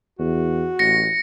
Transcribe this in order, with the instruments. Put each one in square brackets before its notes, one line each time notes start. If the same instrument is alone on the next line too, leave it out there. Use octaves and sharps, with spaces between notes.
[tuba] E2 [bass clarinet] F#4
[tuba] A1 [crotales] A#6 C#7